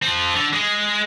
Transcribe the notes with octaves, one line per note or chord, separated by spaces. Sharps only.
F3 C4
D3
G#3